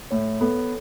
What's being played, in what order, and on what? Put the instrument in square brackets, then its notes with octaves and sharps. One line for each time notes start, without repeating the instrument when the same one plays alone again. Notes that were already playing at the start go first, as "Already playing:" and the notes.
[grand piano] A2 [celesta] C#5
[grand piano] B3 [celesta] A4